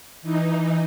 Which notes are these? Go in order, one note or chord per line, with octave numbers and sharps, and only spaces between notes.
E3 D#4